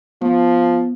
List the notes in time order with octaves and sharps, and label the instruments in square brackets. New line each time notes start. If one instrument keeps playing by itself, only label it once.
[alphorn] F3 [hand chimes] B3